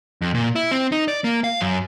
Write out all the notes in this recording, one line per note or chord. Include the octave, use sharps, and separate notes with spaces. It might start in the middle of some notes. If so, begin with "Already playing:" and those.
F2
A#2
E4
C4
D#4
D5
A#3
F5
F#2